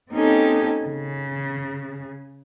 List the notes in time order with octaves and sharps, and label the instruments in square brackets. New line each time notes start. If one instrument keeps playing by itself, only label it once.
[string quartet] A#3 C4 C#4 D#4 G4 A4
C#3